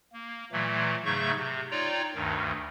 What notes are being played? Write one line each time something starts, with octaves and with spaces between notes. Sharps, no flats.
A#3
A#2 E3 F#3 A3
G#2 C#3 F#3 A3 C#6 G6
C3
D#4 F4 C#5 D5 G5 A#5
D2 G2 D#3